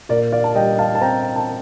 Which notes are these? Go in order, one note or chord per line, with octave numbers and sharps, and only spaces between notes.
A#2 A#4 D5
D5 F5
A5
G3 D#5 G5
F5 A5
A5
C4 G5 A#5
A5